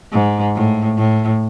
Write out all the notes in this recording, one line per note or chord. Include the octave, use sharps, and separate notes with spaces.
G#2
A2
A2